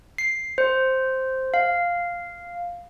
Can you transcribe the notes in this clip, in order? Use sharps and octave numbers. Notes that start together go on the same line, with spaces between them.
C7
C5
F5